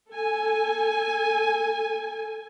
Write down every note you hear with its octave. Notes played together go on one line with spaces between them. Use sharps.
A4 G#5